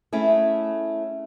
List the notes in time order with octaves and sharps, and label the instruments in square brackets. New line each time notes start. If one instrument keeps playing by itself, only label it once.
[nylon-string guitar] A3 C#4 E4 G#4